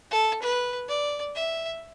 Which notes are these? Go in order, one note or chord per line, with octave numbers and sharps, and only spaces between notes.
A4
B4
D5
E5